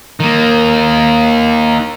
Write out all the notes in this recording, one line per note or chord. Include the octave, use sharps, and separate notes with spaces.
D#3 A#3